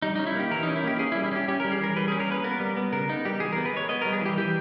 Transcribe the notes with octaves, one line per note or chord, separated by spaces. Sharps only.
G3 D#4
C#4 D#4
E4
A#3 G4
E3 A#4
C#4 D#4
E4
A#3 G4
C#4 G#4
E4
G3
E4
C#4 G4
C#4 G4
G3 A#4
G#4
E3 A#4
G3 B4
C#4 G#4
A#4
A#3 B4
B3 A#4
G3
B3
C#3 A#4
B3 D#4
G3 G4
E3 G#4
B3 A#4
B4
G#3 C#5
B3 D#5
G3 A#4
G#4
E3 G4
E3 G4